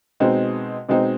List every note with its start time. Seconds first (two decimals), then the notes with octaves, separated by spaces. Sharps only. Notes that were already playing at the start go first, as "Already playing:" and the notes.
0.20 B2 G#3 C4 D#4
0.89 B2 G#3 C4 D#4